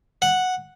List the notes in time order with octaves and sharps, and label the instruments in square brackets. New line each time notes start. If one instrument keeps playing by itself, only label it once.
[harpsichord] F#5